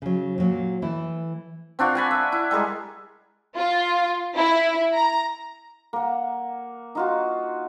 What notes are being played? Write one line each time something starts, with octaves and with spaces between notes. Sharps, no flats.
C#3 F#3
A#2 F#3 A#3
E3 A3 E4
C4 D4 F4 F#4
F#5 G#5 B5
E5
E4
G3 G#3 G#4 A#4
F4
E4
A#5
A#3 F#5
D#4 F4 F#4